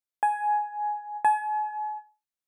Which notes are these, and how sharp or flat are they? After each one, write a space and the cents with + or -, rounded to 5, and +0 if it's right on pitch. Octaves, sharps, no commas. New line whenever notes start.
G#5 +10
G#5 +40